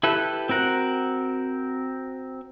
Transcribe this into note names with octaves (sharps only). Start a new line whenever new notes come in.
E4 G4 A4 B4
C4 F#4 A#4 F#5